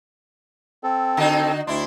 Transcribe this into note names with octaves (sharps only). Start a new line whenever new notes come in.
C4 A4
D3 D#4 F#4
D2 D4 E4 C6